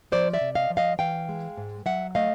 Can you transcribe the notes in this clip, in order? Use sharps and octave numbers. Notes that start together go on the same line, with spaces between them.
F3 C5 D5
D5 E5
C3
D#5 F5
F3
D#5 F5
E3 F5 G5
G#3
G#2
F#3 E5 F#5
A3 D#5 F5